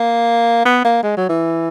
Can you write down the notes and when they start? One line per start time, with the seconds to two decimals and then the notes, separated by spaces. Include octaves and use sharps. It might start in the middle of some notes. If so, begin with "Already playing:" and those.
Already playing: A#3
0.65 B3
0.84 A#3
1.03 G#3
1.17 F#3
1.29 E3